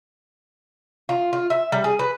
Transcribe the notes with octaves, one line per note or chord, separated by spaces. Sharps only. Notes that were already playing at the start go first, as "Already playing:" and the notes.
F4
F4
E5
G3
G#4
B4